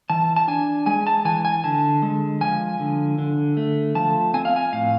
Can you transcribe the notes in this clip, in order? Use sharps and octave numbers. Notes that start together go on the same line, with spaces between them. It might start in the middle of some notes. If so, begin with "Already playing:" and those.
E3 A5
A5
D4 G#5
G#3 G#5
A5
E3 G#5
G#5
D3 A5
G#3
F3 G#5
D3
D3
A3
F3 A5
C4 G#5
F5
G#5
A2 F5